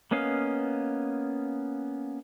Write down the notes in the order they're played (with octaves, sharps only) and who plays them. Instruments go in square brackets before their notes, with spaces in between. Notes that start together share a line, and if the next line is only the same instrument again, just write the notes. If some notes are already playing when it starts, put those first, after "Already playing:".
[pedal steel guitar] A#3 B3 C#4 D#5 F5